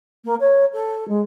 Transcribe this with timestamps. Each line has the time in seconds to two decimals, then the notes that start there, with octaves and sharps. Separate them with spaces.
0.25 A#3
0.40 C#5
0.73 A4
1.08 G#3